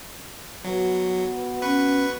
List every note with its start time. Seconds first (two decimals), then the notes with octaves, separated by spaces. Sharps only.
0.65 F#3 B3 F#4
1.62 C#4 B4 C#6